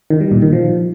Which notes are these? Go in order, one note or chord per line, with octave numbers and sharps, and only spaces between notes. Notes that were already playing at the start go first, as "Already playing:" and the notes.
D#3
G3
A#2
D#3
F3